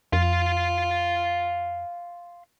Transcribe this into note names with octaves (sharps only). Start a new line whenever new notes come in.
F2 F5 C6